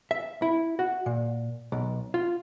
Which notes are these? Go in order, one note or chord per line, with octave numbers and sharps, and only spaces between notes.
E5
E4
F#4
A#2
B1
F4